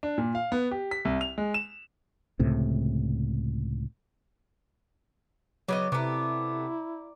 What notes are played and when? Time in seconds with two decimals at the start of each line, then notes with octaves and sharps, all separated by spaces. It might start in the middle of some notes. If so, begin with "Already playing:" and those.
0.03 D4
0.18 A#2
0.35 F5
0.52 B3
0.71 G4
0.91 B6
1.05 C2
1.21 F7
1.38 G#3
1.54 E7
2.39 C#2 A2 C3
5.68 C#3 F#3 B3 D5 D#5
5.92 C3 A3 B3 E4 A#5 D6